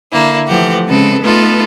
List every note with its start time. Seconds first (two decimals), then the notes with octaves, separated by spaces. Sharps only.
0.12 D3 A#3 E4
0.47 E3 F3 A3 G4 F#5
0.87 C#3 G#3 C4 A4 B4
1.22 A3 B3 D#4 F4 A4 B4